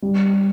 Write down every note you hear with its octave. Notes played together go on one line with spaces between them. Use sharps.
G3